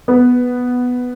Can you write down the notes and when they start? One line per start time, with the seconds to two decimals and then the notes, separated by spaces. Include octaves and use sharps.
0.08 B3